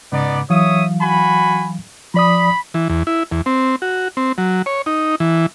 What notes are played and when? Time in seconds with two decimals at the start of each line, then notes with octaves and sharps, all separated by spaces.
0.12 G#2 C#3 B3 D#4 D5
0.50 E3 F#3 C#5 E5 F5 D#6
1.00 F#4 G#5 B5
2.14 F3 D5 B5 D#6
2.74 E3
2.89 E2
3.07 E4
3.32 E2
3.46 C4
3.82 F#4
4.17 C4
4.38 F#3
4.66 C#5
4.86 D#4
5.20 E3